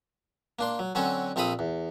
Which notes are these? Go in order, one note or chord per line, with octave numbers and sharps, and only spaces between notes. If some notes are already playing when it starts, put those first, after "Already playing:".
A#3 D4 C6
F#3
D3 F#3 C4 C#4 F#4 A4
A#1 C4 A4 F5 B5 D#6
E2